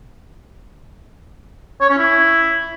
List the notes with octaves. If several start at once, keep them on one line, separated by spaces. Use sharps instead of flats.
C#5
C#4
E4